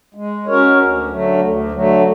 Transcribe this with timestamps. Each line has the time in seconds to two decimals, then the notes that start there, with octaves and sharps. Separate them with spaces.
0.14 G#3
0.46 C#4 F#4 A#4 C#5
0.78 D2
1.09 D3 F#3 A3
1.41 D2
1.72 D3 F#3 A3